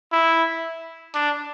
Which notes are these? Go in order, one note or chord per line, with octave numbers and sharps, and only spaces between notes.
E4
D4